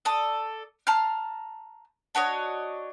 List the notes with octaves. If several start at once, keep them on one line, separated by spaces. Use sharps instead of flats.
A4 D5 D#6
A5 A#5 C6 F6
D4 F#4 C#5 D#5